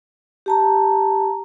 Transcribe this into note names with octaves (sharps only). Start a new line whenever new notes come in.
G4 A5 A#5